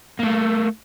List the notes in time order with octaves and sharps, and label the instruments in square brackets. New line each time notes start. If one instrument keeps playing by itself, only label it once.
[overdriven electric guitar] A3 A#3